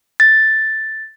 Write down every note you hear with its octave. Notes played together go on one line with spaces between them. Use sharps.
A6